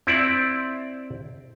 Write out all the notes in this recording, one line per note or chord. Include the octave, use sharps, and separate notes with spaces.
C4 E4 D5